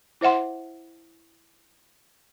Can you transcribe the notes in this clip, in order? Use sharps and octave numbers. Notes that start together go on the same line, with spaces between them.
E4 C5 E5 F#5 C6